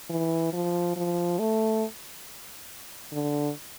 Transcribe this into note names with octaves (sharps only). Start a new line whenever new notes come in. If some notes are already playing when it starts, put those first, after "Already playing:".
E3
F3
F3
A3
D3